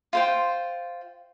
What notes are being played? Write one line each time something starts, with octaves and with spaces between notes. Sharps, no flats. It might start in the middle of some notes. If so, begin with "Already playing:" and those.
F4 C5 G5